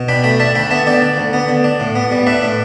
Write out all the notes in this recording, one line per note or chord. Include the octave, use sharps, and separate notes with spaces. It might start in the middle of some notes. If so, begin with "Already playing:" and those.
Already playing: B2
D4 G5 B5
A3 G5 B5
D4 E5 A5
D2 G5 B5
B3 E5 A5
D3 D5 G5
D4
D2
B3
D3
D4
A2
B3
G3
D4 B4 E5
A2